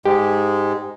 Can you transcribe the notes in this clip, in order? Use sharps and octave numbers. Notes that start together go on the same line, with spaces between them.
G#2 G#3 G4